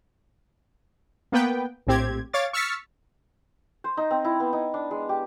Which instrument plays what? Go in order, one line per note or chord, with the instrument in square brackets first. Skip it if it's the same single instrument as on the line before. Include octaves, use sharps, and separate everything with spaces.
[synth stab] A#3 B3 B4 G5
A#1 A2 C4 G4 G#6
C#5 F5 D6 A6
C#6 E6 F6 A6 B6 C#7
[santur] C5
D#4
C4
E4
B3
D#4
D4
G#3
G4